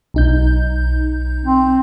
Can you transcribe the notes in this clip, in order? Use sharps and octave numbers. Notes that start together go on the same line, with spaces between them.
B1 D#4 G6
C4